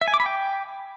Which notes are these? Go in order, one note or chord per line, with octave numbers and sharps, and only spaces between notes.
E5
G#5
D6
B5
G5